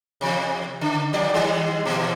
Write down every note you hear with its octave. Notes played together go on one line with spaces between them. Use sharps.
E2 C3
C#3
D#2 F3 D5
D#3 G3 G#3
A#2 E3